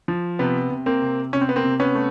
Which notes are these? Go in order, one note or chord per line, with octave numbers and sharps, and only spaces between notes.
F3
C3 B3
C3
A#3 C4
C3
C3 C#4
C4
B3
A#3 C4
C3
B3 C#4
A3